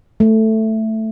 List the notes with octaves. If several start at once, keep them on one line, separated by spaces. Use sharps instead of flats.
A3